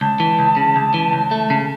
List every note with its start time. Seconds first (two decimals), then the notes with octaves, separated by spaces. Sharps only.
0.01 C#2 A5
0.20 E3
0.39 C#2
0.57 C#3
0.76 C#2
0.94 E3
1.13 C#2
1.31 A3
1.50 C#3